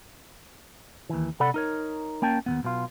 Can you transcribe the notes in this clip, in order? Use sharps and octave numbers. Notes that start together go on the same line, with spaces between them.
D#2 E3
C3 A4 D5 F#5 B5
D#4 A#4 C#5
A#3 C#4 G5 A5
D#2 C3 B3
B1 B2 F4